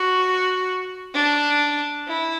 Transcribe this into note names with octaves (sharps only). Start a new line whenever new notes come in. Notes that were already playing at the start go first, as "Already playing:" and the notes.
Already playing: F#4
D4
E4